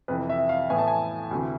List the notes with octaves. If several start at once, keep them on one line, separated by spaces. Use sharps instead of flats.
F2 C3 E3 B4
E5
F5
A2 E3 B3 E4 G#5
A5
G#5
D2 C3 E3